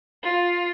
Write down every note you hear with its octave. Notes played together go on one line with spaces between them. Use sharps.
F4